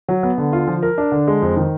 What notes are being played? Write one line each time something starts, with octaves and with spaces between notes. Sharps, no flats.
F#3
B3
D3
F4
F3
A#4
D4
D3
G#3
F2
D#3